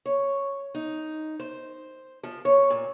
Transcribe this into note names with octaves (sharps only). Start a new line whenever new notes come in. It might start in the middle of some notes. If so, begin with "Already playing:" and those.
C#5
D#4
C5
F3
C#5
A#2